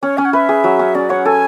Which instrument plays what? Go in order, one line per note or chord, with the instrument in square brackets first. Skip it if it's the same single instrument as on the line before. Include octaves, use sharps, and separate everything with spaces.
[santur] C#4 [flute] C#5
[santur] C#4 [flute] G#5
[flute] F#5
[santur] B4 [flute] E5
[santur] G#4
F#3
C#4
[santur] C#4 [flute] D5
[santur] C#5 [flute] F#5
[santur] A4 [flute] G#5